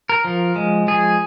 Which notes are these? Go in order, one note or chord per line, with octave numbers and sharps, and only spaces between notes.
A#4
F3
G#3
F3 G#4